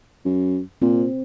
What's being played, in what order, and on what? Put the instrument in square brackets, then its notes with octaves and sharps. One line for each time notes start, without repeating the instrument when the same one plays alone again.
[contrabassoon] F#2
[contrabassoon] A#2 [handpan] C4